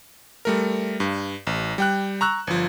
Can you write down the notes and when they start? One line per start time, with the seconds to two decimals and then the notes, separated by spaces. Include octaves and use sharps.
0.45 G3 A3 A#4
1.00 G2
1.47 A1
1.78 G3 G5 F#6
2.21 A#5 C#6 E6 F#6
2.47 G1 F3